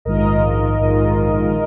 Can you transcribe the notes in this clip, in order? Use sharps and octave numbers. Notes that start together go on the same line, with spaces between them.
A#1 G#2 D#3 G#3 F4 A#4 D#5
A#1 G#2 D#3 G#3 F4